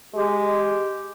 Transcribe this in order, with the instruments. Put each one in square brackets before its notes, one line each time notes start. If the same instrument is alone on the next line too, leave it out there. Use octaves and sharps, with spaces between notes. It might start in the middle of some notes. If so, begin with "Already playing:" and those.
[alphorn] G#3 [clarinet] G4